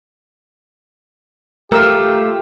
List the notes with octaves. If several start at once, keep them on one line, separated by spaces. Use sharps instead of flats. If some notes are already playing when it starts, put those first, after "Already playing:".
A3 F4 G4 A#4 E6